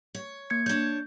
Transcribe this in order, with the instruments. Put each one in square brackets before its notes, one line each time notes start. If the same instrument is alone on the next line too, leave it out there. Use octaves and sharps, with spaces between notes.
[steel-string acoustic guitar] C#5
[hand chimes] A#3 G#6 C#7
[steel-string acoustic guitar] D4 C#5 [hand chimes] G6